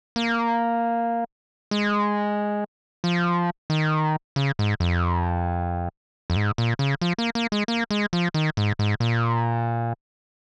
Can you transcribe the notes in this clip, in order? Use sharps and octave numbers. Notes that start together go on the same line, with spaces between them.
A#3
G#3
F3
D#3
C#3
G#2
F2
F2
G#2
A#2
C#3
F3
A#3
A#3
G#3
A#3
G#3
F3
D#3
G#2
G#2
A#2